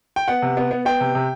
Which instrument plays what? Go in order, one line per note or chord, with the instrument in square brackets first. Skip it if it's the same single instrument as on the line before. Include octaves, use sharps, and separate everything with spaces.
[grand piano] G5
[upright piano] B3 [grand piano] F#5
[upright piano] C3
B3
B3
[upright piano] B3 [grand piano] G5
[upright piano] C3
C3